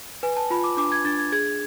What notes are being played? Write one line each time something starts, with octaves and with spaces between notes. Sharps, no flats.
B4 G#5
A5
F4 B5
D6
D4 D6
G#6
D4 A6
G#6
G#4 G#6